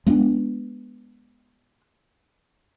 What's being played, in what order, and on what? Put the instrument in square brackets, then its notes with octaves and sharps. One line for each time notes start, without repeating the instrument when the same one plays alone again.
[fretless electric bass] G#3 B3 C#4 D4